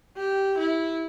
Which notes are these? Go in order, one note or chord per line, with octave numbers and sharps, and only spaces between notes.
G4
E4